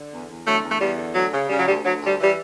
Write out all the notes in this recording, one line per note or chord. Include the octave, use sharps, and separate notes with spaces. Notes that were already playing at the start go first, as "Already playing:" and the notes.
Already playing: D3
E2
E2
D3 F#3 A3
E2
A3
E2 G3
D3
D2 F#3
C#3
C#3 G3
F#3
D2 G3
D2 F#3
D2
G3
E3 G3